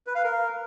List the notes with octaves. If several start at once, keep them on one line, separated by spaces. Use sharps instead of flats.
B4
F5
A#4